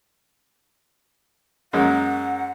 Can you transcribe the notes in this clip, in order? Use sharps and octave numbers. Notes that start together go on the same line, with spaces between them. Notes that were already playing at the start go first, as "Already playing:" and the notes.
F#2 G#3 A#3 F#5